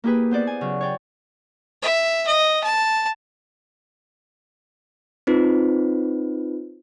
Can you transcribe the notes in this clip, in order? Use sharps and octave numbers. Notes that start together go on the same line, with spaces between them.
A#3 E4 G4 G#4 B4
B3 C5 D5 F#5
G#5
C#3 F#3
C#5 D5 G5
E5
D#5
A5
C4 D#4 F4 B4 C5